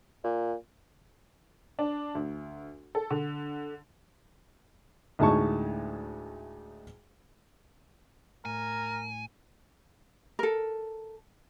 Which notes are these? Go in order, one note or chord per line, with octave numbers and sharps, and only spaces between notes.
A#2
D4
D2
A4
D3
D2 A2 G#3 D#4 A5 C#6
A2 A#4 G#5
A4 A#4